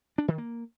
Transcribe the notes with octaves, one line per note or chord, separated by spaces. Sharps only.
D4
D#3
A#3